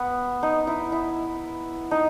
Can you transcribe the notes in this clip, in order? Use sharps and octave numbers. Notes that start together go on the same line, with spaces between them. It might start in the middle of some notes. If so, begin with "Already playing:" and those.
Already playing: B3
D#4
E4
E4
D#4